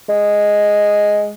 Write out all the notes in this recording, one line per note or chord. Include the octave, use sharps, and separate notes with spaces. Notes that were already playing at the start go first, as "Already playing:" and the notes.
G#3